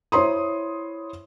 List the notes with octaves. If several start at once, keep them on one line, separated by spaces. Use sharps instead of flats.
E4 C5 C#5 C6 D#6